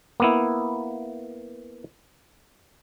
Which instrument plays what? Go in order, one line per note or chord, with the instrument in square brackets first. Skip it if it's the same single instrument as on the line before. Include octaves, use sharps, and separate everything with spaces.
[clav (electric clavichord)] A#3 B3 E4